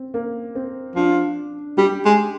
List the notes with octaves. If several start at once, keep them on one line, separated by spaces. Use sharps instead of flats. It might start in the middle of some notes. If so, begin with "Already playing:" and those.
Already playing: C4
A#3
C4
F3 D4
G3 G4
G#3